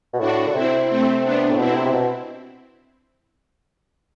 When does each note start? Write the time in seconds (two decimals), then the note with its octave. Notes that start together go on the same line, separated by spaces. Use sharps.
0.13 B2
0.19 A2 D4 F#4
0.47 D3
0.54 C3 C4 E4
0.89 A3 C4
1.23 B3 D4
1.50 A2
1.58 B2 C4 E4
1.75 C3
1.86 C3
1.93 B2